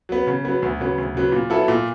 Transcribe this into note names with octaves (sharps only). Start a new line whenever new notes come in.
F#3 B3
C#3
F#3 B3
D2
C#3 F#3 B3
D2
C#3 F#3 B3
A#2
F#3 B3 E4 A4
A#2